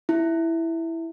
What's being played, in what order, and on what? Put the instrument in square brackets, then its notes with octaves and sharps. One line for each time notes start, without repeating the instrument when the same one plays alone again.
[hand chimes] E4